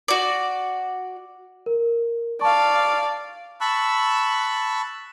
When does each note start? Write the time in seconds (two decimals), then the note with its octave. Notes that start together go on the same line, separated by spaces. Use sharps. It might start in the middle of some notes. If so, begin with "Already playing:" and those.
0.08 F#4 D5
1.66 A#4
2.41 D5 F5 A5 C#6
3.61 A5 B5 C#6 E6 F#6